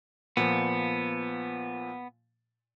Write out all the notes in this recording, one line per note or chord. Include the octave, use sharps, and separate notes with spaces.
A#2 F3 B3